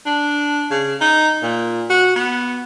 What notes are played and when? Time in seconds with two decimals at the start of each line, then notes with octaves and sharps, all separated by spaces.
0.06 D4
0.71 C#3
1.01 D#4
1.42 A#2
1.90 F#4
2.16 B3